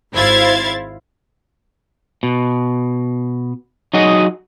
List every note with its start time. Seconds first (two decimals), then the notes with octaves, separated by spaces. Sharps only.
0.13 G#1 E4 C5 F5 G#6 A6
2.23 B2
3.94 F#3 D#4 F#4 G#4 D#5